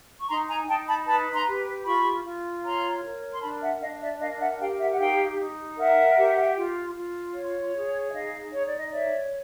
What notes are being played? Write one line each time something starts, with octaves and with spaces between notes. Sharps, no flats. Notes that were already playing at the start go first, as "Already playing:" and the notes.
C#6
D#4 A#5 C6
G#5 A#5
D#4 G5 A5
A5 B5
B4 A5 B5
A#5 C6
G4
F4 B5 C#6
F4
C#5 A#5 C6
A#4
C6
D4 A5 B5
E5 F#5
D4 D#5 F5
D5 E5
A#4 D#5 F5
E5 F#5
G4 F5 G5
E5 F#5
F#5
D#4 F5 G5
D#4
A#4 E5 F#5
G4
F4
F4
C#5
G#4
E5
D#4 D#5 F5
D#4 C#5
D5
D#5
C#5 D5 E5